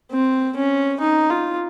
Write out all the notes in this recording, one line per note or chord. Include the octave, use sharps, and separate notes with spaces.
C4
C#4
D#4
F4